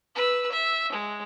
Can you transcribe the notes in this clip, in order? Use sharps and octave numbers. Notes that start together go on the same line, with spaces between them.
B4 E6
E5
G#3